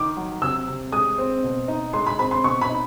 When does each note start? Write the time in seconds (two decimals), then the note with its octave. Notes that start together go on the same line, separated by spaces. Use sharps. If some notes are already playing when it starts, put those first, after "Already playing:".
Already playing: D#3 D6
0.17 F#3
0.41 C3 E6
0.67 C3
0.92 G#3 D#6
1.18 C4
1.43 B2
1.68 D#4
1.93 G#3 C6
2.07 B5
2.19 C4 B5
2.31 C6
2.44 B2 C#6
2.61 B5
2.69 D#4